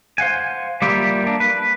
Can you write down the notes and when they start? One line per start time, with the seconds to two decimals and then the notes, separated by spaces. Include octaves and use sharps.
0.18 C5 F5 F#5 G#5
0.82 G3 A#3 E4 F4 G4
1.24 A#3 D4
1.40 B4